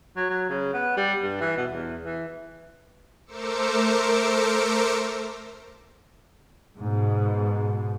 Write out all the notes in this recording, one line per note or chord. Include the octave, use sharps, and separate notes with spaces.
F#3
F#3
C#3
B3
G3
G2
E3
B2
E2
E3
A3 A#4 C5 D6 E6 C#7
G#2 B2